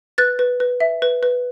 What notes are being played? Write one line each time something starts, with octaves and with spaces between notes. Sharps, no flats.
B4 F#6 A6
B4
B4
E5
B4
B4